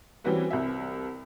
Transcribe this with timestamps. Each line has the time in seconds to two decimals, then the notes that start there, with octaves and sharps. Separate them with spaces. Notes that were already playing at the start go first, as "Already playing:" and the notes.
0.24 E3 G3 C4 C#4 F#4 B4
0.51 C2 E5